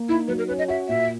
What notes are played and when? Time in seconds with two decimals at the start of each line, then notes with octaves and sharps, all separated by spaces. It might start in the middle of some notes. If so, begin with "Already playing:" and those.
Already playing: A#3
0.09 D#4 E4
0.28 F#3 B4
0.38 A#4
0.48 C#4 B4
0.59 D#5
0.68 F#4 E5
0.88 A#2 E5